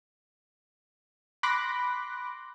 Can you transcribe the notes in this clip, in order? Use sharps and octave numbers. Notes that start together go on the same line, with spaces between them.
B5 C6 D6 F#6 A#6